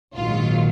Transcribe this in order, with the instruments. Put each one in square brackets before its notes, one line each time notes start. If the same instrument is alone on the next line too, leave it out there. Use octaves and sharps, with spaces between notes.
[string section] A#1 G#2 D#3 F#3 F4